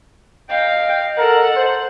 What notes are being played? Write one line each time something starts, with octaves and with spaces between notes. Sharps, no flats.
D#5 F5 G5
A4 A#4 F#5
C5